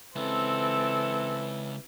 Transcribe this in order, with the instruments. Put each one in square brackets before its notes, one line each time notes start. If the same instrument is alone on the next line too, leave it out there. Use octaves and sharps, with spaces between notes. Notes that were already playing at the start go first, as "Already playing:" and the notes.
[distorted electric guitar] C#2 [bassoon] E3 [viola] C4 A4